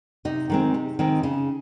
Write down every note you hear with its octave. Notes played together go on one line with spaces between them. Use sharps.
C3 D#4
D#3 G#3 C4
C3
D#3 G#3 C4
C#3